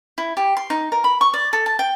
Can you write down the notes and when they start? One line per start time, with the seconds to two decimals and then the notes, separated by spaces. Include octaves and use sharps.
0.18 E4
0.37 G4
0.57 C6
0.70 D#4
0.92 A#4
1.04 B5
1.21 C#6
1.34 D5
1.53 A4
1.66 A5
1.79 G5